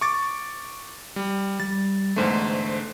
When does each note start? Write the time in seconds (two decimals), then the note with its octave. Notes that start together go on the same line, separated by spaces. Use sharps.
0.01 C#6 D6 A6
1.16 G3
1.60 G3 A6
2.16 E2 G#2 D3 A3 C5